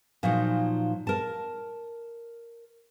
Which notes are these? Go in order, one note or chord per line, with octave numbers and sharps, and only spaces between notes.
A#2 F3 F#3 D#4
A#4 A5